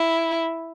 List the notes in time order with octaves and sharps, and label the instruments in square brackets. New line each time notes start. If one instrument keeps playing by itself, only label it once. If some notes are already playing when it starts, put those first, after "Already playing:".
Already playing: [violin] E4